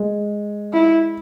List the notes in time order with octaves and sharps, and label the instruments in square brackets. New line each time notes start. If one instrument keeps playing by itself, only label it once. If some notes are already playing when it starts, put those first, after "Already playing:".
Already playing: [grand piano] G#3
[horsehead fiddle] E4